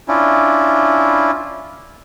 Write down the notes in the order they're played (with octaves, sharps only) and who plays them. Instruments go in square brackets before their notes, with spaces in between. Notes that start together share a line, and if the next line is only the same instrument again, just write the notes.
[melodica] C#4 D4 E4 F4